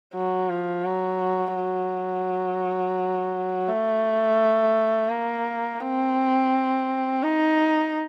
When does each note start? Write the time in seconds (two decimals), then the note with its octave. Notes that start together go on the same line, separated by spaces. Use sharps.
0.14 F#3
0.49 F3
0.84 F#3
1.56 F#3
3.68 A3
5.10 A#3
5.81 C4
7.23 D#4